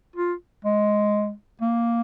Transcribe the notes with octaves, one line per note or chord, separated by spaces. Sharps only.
F4
G#3
A#3